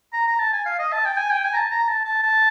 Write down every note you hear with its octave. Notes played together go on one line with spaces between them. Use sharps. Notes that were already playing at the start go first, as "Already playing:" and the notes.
A#5
A#5
A5
G#5
F5
D#5
A5
G5
G#5
G5
G#5
A#5
A5
A#5
A5
A5
A5